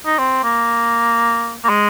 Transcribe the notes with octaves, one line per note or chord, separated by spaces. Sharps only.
D#4
C4
A#3
A#3
G#3